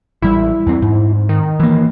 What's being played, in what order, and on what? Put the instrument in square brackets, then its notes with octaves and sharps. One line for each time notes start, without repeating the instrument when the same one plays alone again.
[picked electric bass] A1 G3 [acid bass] E4
[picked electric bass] E2 C4
G#2
[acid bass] D#3
[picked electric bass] E3 A#3